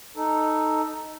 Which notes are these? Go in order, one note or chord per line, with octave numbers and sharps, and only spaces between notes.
D#4 A4